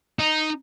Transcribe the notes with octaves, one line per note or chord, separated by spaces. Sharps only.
D#4